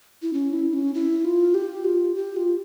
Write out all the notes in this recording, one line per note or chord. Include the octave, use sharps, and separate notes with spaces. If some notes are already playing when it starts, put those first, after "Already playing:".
E4
C#4
E4
C#4
E4
F4
G4
F4
G4
F4